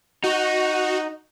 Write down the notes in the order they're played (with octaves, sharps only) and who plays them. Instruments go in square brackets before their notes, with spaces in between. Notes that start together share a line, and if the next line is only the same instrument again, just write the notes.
[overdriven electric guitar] D#4 [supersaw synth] F#4